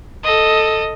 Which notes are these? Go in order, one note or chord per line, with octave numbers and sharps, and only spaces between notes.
A4 D#5